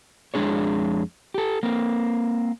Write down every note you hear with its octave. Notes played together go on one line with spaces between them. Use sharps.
F2 G#3 D4 G#4 C#5
G4 A4
A#3 C4